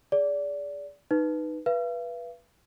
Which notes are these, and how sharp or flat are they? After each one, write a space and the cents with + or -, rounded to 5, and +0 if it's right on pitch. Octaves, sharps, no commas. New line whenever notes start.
G#4 +0 D5 -25
D#4 -10 B4 +5
B4 -15 F5 -45